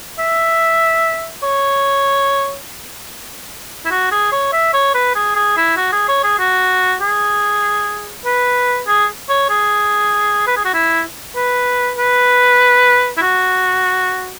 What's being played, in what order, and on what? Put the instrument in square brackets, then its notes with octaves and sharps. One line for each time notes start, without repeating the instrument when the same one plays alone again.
[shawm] E5
C#5
E4
F#4
G#4
C#5
E5
C#5
B4
G#4
G#4
E4
F#4
G#4
C#5
G#4
F#4
G#4
B4
G#4
C#5
G#4
B4
G#4
F#4
E4
B4
B4
E4
F#4